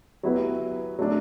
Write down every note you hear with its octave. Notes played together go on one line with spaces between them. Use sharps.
F#3 B3 E4 G4 B4
F#3 A3 D4